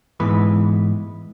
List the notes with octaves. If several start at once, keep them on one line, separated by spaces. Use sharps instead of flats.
G#2 E3 B3 B4